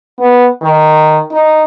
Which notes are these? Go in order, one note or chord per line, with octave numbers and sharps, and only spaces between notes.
B3
D#3
D#4